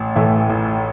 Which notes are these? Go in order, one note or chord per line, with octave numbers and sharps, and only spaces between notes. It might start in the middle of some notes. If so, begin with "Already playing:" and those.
Already playing: A1
A2 E3 A3
A1